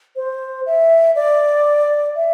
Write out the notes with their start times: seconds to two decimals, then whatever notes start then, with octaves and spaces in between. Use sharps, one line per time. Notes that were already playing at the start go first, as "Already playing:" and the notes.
0.16 C5
0.66 E5
1.15 D5
2.16 E5